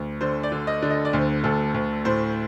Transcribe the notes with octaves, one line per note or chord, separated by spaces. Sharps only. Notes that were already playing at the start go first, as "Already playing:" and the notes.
Already playing: D2
D3 C5
D5
D3
D#5
D3
D#5
D5
D2 C5
D2 A4
D2
A2 C5